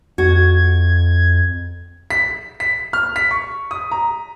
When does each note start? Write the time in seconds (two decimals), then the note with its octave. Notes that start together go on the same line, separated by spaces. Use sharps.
0.18 F2 F#4 G#6
2.10 B6
2.60 B6
2.93 F6
3.16 B6
3.31 C#6
3.71 D#6
3.91 A#5